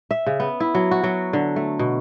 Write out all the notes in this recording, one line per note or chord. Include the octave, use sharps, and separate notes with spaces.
E5
C#3
B3
E4
F#3
F#4
F#3
D3
A3
B2